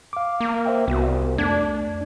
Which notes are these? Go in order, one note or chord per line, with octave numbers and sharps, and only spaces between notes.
F5 D6
A#3
C5 E5 G5
C2 B3 F#4
F2 A3 D4 G#6